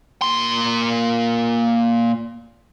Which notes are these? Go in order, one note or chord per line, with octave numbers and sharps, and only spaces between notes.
A#2 C6